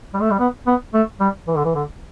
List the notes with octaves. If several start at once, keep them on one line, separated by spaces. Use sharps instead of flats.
G3
A3
G3
B3
B3
A3
G3
E3
D3
E3
D3